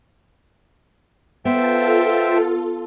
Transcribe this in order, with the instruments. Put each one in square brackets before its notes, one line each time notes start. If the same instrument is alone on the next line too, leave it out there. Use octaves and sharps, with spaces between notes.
[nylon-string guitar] B3 [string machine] F4 A4 [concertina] C5 E5 G5